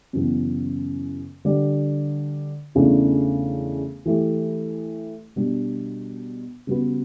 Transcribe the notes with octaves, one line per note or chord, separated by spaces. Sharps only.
F#2 C#3 E3 B3
D3 G3 D4 G4 D5
E2 C#3 E3 A3 D4
E3 A3 E4 G4
B2 G3 D4
C#3 G3 B3 F#4 B4